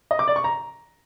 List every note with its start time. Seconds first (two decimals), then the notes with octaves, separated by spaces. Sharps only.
0.11 D#5
0.19 D6
0.28 D5
0.36 C#6
0.44 A#5